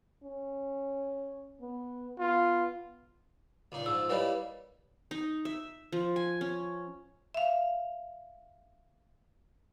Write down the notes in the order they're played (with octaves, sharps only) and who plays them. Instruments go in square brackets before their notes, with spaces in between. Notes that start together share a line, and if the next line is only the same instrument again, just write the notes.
[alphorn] C#4
B3
[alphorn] B3 [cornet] F4
[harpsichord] C#2 A#2 D#4
[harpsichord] G#2 F3 [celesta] E6
[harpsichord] G3 A#3 E4 [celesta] B4 C#5 D#5
[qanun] D#4
E5
F3
G#5
C#4
[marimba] E5 F5